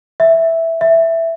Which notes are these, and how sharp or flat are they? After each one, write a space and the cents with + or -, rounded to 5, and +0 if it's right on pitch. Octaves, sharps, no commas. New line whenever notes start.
E5 -5
E5 +0